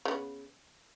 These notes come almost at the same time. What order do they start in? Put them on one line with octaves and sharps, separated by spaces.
C#3 A3 B3